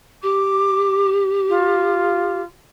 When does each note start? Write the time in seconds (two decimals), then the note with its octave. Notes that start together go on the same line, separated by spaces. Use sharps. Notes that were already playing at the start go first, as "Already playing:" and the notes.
0.23 G4 D6
1.49 F4